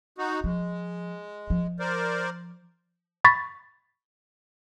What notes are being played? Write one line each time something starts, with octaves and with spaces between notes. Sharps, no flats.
D#4 F#4
F3 G#3
F3
A#4 C5 D5
B5 C#6 A6 B6